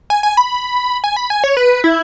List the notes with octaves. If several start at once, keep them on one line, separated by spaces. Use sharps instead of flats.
G#5
G#5
B5
G#5
B5
G#5
C#5
B4
E4